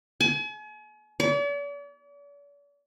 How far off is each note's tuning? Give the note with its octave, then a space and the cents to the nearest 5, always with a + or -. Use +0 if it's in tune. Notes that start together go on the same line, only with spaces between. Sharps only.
G#5 +40
D5 -45